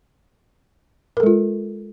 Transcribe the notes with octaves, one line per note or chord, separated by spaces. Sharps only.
G#3 F4 A4 A#4